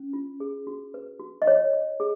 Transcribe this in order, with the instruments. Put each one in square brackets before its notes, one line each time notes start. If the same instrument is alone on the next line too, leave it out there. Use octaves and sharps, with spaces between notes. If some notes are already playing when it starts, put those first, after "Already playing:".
Already playing: [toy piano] C#4
F4
G#4
F#4
B4
F#4
D#5
C#5
C#5
G#4